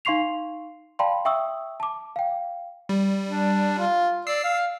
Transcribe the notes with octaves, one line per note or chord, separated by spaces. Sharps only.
D#4 F5 C6 C#6 C7 F7
D5 F5 G5 A5 B5 C6
E5 G5 C#6 D#6 E6
A5 D6
F5 G5
G3
D4
F4
D5 E6 C7
F5